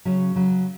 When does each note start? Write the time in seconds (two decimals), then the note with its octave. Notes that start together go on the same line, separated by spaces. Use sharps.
0.05 C#3 F#3 C#4
0.35 C#3 F#3